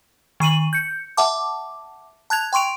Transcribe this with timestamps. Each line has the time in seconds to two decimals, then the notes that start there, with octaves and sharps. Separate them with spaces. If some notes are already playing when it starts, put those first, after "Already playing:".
0.40 D#3 C#6 D#7 F#7
0.73 G6 C#7
1.17 E5 F#5 A5 D6
2.30 A5 F#6 G#6 F7
2.53 G5 C6 C#6 D7 F7